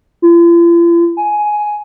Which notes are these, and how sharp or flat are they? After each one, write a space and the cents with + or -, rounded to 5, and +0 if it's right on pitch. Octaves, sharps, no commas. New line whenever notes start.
F4 -45
G#5 +10